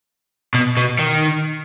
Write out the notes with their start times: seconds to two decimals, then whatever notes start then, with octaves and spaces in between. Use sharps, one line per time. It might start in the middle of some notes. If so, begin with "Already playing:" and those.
0.54 B2
0.77 B2
0.99 D#3